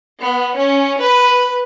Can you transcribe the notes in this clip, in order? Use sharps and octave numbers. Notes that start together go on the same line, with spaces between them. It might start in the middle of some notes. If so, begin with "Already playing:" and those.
B3
C#4
B4